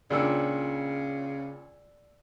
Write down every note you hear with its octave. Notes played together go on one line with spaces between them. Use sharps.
C#2 A#2 C#3 D4 D5 E6